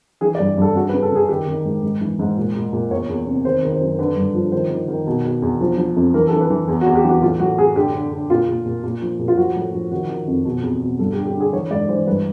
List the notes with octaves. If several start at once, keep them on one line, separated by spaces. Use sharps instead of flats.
E3 G#4
D5
G2
G2 A4
C#3 F#4
B4
C#3
A4
C#3 G#4
D#3 G4
D#3
G#2
G#2
E3
G#2
A#2
A#2
A#2
E2 C#5
E2
C3
D#3 C5
D#3
C5
F#2
D3 B4
G2
F3
D#3 C5
D#3
D#3
B2
B2
E2
F3
F3
F2
E3 A#4
A4
E3
B4
E3
E2
F#4
E2
G4
E3 F#4
A2 F4
A2 F#4
A2 G#4
D3 G4
D3
D3
A#2 F4
A#2
A#2
A#2
F3
A#2
F4
F3 F#4
A2
F3
D#3 F#4
D#3
F2
B2
E2
B2
G2 A4
G4
D3
G4
D3 G#4
E3 C#5
G#2 D5
E3 C5
G2 B4